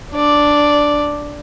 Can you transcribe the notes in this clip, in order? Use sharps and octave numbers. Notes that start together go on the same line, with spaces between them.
D4 D5